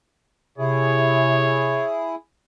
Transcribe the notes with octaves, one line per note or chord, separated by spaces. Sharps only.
C3 E4 G#4 C#5